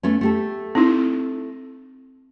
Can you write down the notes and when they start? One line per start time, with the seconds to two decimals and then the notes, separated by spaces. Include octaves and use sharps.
0.03 A3 B3 C#4
0.21 A3 G4 A4
0.75 C4 D#4 E4